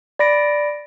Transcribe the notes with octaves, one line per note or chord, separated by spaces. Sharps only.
D5 B5 A#6 D7